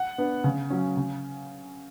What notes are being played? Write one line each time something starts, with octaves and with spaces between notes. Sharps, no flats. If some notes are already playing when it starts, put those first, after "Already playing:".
Already playing: F#5
B3 D4
C#3
F#3 C#4
C#3